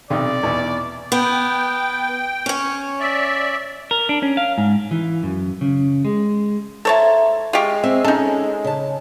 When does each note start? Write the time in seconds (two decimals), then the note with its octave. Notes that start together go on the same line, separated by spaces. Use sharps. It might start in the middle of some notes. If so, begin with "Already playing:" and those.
0.10 B1 C3 D5
0.43 E2 B2
1.12 B3 G5
2.46 C#4 C#5
3.00 D5 E5
3.91 A#4
4.09 D4
4.23 C#4
4.37 F5
4.58 G#2
4.91 E3
5.23 F#2
5.61 C#3
6.05 G#3
6.85 E4 A4 C5 C#5 A5 A#5
7.53 G#3 F4 G4 F5 C#6
7.84 C4 E5
8.04 C#4 D#4 A4
8.64 C#3 A5